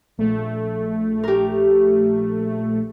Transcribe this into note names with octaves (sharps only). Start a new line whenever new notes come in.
A#1 A3
G4 A#4